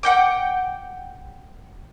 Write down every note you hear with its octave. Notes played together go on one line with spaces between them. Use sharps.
F#5 G5 D6